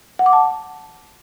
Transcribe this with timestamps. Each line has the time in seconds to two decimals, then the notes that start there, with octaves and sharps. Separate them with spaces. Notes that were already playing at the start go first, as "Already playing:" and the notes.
0.19 F#5
0.26 D6
0.33 A5